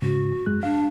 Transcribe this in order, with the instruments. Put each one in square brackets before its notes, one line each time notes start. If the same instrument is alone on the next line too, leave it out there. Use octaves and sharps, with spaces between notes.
[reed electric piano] D#2 G#2 C#3 [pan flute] F#4
[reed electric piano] F#2 G#3 F#6
[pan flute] D4 [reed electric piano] F5